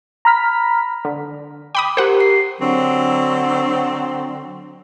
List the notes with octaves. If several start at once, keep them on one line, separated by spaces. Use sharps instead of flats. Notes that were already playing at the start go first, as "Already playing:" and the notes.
A#5 B5 F6 B6
D3
G5 B5 D6 D#6
G4 A#4 C5 F#5
C7
D3 F#3 C4